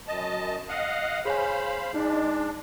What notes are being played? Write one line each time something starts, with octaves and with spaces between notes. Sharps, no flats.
F#2 D#5 A5
D#5 F5 F#5
G#4 C5 C#5 F5 G#5 B5
G#3 D4 D#4